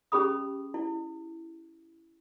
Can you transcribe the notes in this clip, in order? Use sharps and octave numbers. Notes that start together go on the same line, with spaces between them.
C#4 G4 G#4 B5 D#6
E4